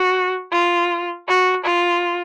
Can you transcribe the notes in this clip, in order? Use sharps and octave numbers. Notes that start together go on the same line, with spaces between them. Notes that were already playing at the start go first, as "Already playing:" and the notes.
Already playing: F#4
F4
F#4
F4